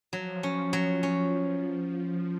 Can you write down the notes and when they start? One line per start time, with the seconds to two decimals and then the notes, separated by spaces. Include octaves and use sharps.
0.13 F3 F#3
0.43 C#4
0.73 F#3
1.03 C#4